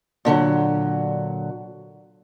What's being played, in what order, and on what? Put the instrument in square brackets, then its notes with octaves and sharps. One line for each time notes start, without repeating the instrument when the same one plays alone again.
[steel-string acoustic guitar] A#2 D3 F3 F#3